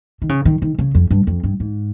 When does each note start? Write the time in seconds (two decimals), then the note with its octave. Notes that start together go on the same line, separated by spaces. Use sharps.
0.22 D#3
0.29 C#3
0.45 D#3
0.62 D#3
0.79 C#3
0.95 F2
1.10 G2
1.27 F2
1.44 G2
1.60 G#2